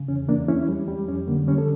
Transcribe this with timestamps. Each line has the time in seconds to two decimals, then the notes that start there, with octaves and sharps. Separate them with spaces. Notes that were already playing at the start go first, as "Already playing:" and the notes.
Already playing: C#3
0.08 E2 C#4
0.28 E2 A#3 D4
0.48 E2 C#4 E4
0.68 G3
0.88 G3
1.08 F2 C#4
1.28 D3 A#3
1.47 G3 C#4
1.58 A4